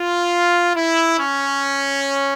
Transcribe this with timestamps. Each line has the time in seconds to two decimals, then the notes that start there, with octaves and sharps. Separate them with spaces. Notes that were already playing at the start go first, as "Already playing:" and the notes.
Already playing: F4
0.76 E4
1.20 C#4